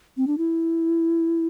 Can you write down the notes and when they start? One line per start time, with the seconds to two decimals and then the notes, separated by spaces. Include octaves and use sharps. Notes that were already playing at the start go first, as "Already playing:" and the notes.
0.17 C4
0.27 D4
0.38 E4